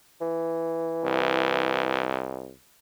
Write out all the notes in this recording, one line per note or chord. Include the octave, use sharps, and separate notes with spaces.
E3
C2